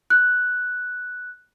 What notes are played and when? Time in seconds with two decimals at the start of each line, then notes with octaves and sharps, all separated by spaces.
0.10 F#6